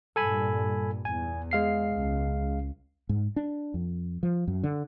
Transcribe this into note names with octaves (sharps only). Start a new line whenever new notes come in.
G2 A#2 A4 G#5 B5
E2 G#5
G#3 F5 C7
C#2
G#2
D4
F2
F3
F#2
D3